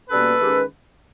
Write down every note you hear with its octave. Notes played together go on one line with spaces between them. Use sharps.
B2 G3 A#3 C#4 A4 B4
D#3 G#3 C#4 G4